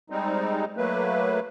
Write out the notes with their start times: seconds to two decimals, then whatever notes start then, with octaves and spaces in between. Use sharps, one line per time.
0.10 G3 G#3 C4 D#4
0.77 F#3 A3 A#3 B4